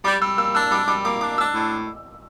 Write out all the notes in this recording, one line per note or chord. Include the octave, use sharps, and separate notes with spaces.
G3 D6
G3 E6
A#3 E6
D4 E6
G3 D6
G3 D6
A#3 D6
D4 D6
D4 E6
A2